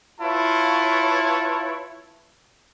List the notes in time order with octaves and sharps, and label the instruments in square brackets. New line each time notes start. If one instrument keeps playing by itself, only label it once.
[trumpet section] E4 F4 B4 C#5 A5